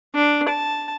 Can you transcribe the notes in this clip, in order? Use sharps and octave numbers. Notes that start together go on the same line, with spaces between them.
D4
A5